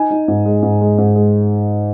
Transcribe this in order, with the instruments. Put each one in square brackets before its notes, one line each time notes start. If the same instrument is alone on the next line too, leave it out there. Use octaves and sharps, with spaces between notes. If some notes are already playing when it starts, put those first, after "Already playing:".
Already playing: [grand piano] D#4 G#5
D#4
G#2
G#3
G#2
G#3
G#2
G#3